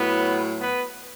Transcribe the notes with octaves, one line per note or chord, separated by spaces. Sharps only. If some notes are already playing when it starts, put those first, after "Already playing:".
Already playing: A2 F#3 B3 B4
B3 B4